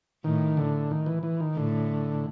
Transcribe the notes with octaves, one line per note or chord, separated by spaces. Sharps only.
A2 D#3
D3
D#3
E3
E3
D#3
A2 D3